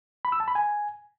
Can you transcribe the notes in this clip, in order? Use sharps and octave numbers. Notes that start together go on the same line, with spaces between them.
B5
E6
A5
B5
G#5